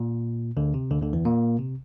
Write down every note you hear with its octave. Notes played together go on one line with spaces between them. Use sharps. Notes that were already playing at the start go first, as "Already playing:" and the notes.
Already playing: A#2
D2 D3
C3
D2 D3
D2 D3
E2 E3
A#2 A#3
C3